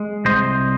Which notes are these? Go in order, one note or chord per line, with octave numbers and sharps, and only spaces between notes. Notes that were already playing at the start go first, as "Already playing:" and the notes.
Already playing: G#3
C2 C5 D#5